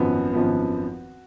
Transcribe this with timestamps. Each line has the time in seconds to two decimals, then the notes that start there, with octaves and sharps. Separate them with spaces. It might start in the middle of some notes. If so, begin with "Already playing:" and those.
Already playing: G#1 F#2 F3 B3 F#4
0.33 G#1 F#2 F3 B3